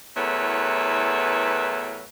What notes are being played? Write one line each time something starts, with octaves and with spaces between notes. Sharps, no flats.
E2 A2 F#3 A#4 B4 E5